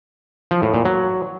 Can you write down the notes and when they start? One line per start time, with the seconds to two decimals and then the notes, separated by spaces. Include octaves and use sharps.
0.51 F3
0.62 A2
0.74 A#2
0.85 F#3